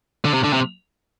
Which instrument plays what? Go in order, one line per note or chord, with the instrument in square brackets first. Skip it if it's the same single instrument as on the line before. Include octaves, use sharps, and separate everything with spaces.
[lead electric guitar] D3
C3
D3
C3